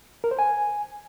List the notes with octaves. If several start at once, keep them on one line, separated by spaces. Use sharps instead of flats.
A#4
C5
G#5